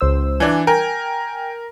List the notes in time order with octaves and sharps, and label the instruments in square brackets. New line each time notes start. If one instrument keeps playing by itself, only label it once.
[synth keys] C#2 C5 E6
[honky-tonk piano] E3 D4 [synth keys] G#5
[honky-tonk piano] A#4 [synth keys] G5 G#5